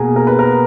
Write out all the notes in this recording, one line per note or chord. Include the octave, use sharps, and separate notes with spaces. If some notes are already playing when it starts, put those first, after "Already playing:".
Already playing: B2 A#3 G#4 A#4
A#4
B4
A#4